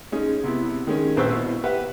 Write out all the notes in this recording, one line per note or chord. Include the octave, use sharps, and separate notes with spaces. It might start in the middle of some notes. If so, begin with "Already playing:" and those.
G#3 C#4 D#4 G#4
C3 B3 E4
D#3 G#3 C#4
A#1 C4 B4 C5 C#6 E6
B2 E4
G4 B4 E5 F#5